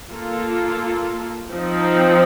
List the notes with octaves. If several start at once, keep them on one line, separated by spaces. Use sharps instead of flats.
A#3 F4 A4
F3 C4 D#4